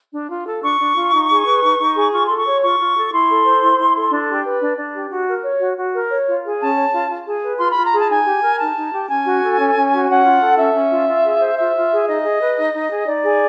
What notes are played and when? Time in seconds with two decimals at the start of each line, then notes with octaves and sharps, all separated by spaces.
0.13 D4
0.30 F4
0.47 A4
0.63 D4 C#6
0.80 D4
0.96 F4
1.13 D#4
1.30 G#4
1.46 B4
1.63 D#4
1.79 D#4
1.96 G#4
2.12 F4 C#6
2.25 A4 C6
2.37 C#6
2.46 C#5
2.61 F4 C#6
2.78 F4
2.96 A4
3.11 E4 C6
3.28 A4
3.45 C5
3.62 E4
3.78 E4
3.95 A4
4.11 D4
4.28 G4
4.44 B4
4.61 D4
4.77 D4
4.95 G4
5.10 F#4
5.28 A#4
5.44 C#5
5.60 F#4
5.77 F#4
5.94 A#4
6.10 C#5
6.27 F4
6.44 G#4
6.61 C#4 A5
6.76 C#5
6.93 F4
7.10 F4
7.27 G#4
7.43 B4
7.60 F4 C6
7.72 F4 B5
7.85 A#5
7.92 G#4 A5
8.09 D#4 G#5
8.26 G4
8.43 A#4
8.59 D#4 A5
8.76 D#4
8.93 G4
9.09 C#4 G#5
9.25 F#4
9.42 A4
9.59 C#4
9.76 C#4
9.92 F#4
10.09 C#4 F#5
10.25 F4
10.41 A4
10.58 C#4 E5
10.74 C#4
10.92 F4
11.08 F4
11.24 G#4
11.41 C5
11.57 F4 E5
11.75 F4
11.92 G#4
12.08 D#4 D#5
12.24 G#4
12.41 B4
12.57 D#4
12.74 D#4
12.90 G#4
13.07 D#4 D5
13.24 G#4